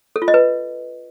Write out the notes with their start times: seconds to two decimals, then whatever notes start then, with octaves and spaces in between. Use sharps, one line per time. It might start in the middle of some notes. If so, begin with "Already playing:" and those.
0.16 A4
0.22 F4
0.28 D#5
0.34 B4